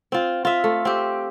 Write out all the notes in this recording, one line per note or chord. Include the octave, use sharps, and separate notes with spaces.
C4 F4
F4 E5
A3
C4 G4